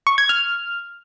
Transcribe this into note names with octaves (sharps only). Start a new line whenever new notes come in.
C#6
G#6
F6